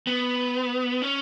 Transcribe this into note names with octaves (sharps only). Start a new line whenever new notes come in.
B3
C#4